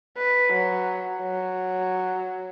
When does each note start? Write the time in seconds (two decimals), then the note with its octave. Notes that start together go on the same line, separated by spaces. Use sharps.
0.17 B4
0.53 F#3
1.21 F#3